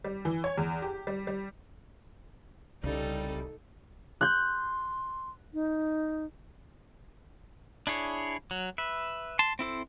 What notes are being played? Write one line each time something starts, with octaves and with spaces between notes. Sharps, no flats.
G3
E3
C#5
E2
G4
G3
G3
C2 C#3 G3 D#4 A4
C6 F#6 G6
D#4
D4 E4 G#4 C#5
F#3
B4 E5
A5 C6
C4 E4 A4 C5